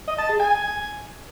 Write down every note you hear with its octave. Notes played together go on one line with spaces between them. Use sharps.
D#5
A5
G#4
G#5